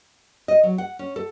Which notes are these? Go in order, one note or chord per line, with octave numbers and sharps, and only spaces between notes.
D#5
F#3
F#5
C#4
A4